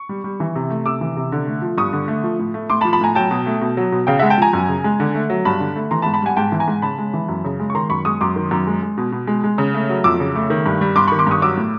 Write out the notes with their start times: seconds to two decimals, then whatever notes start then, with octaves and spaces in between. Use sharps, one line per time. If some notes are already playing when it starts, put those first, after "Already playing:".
Already playing: C#6
0.09 G3
0.24 G3
0.40 E3
0.55 C3
0.70 A3
0.86 C3 D6 E6
1.01 E3
1.17 C3
1.32 D3
1.47 A3
1.62 F3
1.78 G2 C#6 D#6
1.93 D3
2.08 A3
2.24 F3
2.39 A2
2.54 A3
2.70 A2 C6 D6
2.81 A5 B5
2.85 F3
2.93 A5 B5
3.01 A2 G#5 A#5
3.15 F#3 G5 A5
3.31 B2
3.46 A3
3.61 B2
3.77 F#3
3.92 B2
4.07 C#3 F5 G5
4.19 G#3 E5 F#5
4.30 G5 A5
4.38 F3 G#5 A#5
4.53 F#2
4.68 C#3
4.84 G#3
5.00 D3
5.15 A3
5.30 F#3
5.45 G2 A5 B5
5.60 D3
5.76 A3
5.91 E3 A#5 C6
6.02 A5 B5
6.06 G#2
6.14 A5 B5
6.22 G3 F#5 G#5
6.36 G#2 G5 A5
6.52 E3
6.60 G#5 A#5
6.68 G#2
6.82 C#3 A5 B5
6.98 G#3
7.14 E3
7.29 F#2
7.45 C#3
7.60 G#3
7.70 C#6
7.75 D#3 A#5 C6
7.90 F#2 B5 C#6
8.05 G#3 C#6 D#6
8.21 F#2 C6 D6
8.36 D#3
8.51 F#2
8.67 G#3
8.83 G#3
8.98 B2
9.12 B2
9.27 G#3
9.44 G#3
9.58 C#3
9.74 A3
9.89 F#3
10.04 F2 D6 E6
10.20 C#3
10.35 A3
10.50 D#3
10.66 G2
10.81 G3
10.96 G2 C6 D6
11.08 B5 C#6
11.12 D#3
11.19 C6 D6
11.27 G2 C#6 D#6
11.42 F#3 D6 E6
11.57 A2